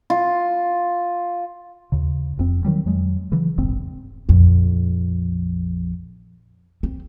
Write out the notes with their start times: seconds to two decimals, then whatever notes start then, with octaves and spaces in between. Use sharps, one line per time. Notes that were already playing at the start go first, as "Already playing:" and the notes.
0.10 F4
1.92 D#2 C#3
2.37 E1 F2 C4
2.65 D#3 F#3 G3
2.85 F2 F#3 G#3
3.32 C#3 E3 F#3
3.58 E1 A#1 G#2 C4
4.29 A#1 F2
6.83 C4